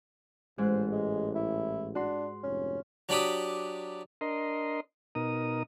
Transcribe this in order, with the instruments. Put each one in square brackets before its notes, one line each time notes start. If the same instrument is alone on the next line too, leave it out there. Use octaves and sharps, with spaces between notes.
[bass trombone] A1 [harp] G#2 F#6 [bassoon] C5
[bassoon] G#3
E4
[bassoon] D4 [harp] F#4 C6
[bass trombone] F1 [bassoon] C#4
[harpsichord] F#3 D4 G4 B5 D6 D#6
[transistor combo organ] D4 A#4 D#5 C6
B2 D#4 A#4 D#6